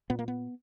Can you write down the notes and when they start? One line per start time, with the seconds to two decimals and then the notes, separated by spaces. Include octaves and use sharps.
0.10 A#2 B3
0.19 A#3
0.28 B3